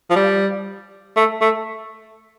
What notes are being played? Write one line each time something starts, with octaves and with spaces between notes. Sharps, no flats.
F3
G3
A3
A3